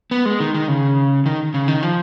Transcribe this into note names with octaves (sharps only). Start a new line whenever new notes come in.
B3
G#3
D#3
D#3
C#3
D#3
C#3
D#3
F3